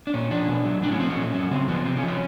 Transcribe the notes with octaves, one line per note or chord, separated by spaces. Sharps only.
D4
A#2 C#4
F3 D4
B2
F#3
A2 D4
C#4
F3 C4
C#4
A#2
F#3
C#3 C4
F3 B3
C3 C4
C#4
F3
C#4